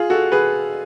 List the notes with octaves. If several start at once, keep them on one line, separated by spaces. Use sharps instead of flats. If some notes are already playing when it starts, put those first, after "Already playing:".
Already playing: F4 G#4
F#4 A4
G#4 B4